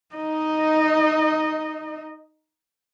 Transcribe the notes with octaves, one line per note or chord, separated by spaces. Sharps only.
D#4 D#5